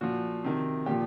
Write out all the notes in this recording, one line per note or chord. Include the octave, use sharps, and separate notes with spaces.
A#2 F3 F#4
C3 D#3
A#2 F3 G4